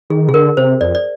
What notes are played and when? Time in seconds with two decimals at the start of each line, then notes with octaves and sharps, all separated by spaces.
0.10 D#3 G#4
0.28 C3 G#4
0.33 D3 A#4
0.57 C3 C5
0.81 F2 D5
0.95 D5